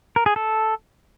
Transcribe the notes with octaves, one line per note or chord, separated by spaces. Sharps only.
A#4
G#4
A4